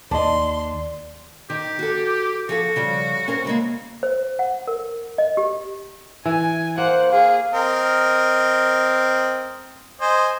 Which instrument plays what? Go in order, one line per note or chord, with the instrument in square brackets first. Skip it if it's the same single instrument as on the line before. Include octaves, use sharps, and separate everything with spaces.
[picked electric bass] D#2 D#3 [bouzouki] D4 [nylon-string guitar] D#5 A5 [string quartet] C6
[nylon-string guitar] D#3 [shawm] G4
[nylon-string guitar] F#4 A4
[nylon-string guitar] F3 G#4 A4 [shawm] F#4
[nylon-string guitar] C#3 F3 G3
C#4 A#4 C5
C#3 G#3 A#3
[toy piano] C5
F#5
A#4
D#5
G4
[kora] E3 [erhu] G#5
[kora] A#3 [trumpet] C5 [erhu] F#5
[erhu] G#4 [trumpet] F5
[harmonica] C4 A#4 D#5
C5 D#5 G#5